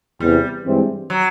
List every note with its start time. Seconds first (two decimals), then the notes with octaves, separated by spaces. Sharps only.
0.20 E2 C3 E3 G3
0.65 G2 E3 G#3 C4
1.10 F#3